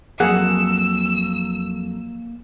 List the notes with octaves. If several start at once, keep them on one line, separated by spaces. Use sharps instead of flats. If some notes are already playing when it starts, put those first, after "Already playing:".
F2 F#3 A#3 G#4 F#5 E6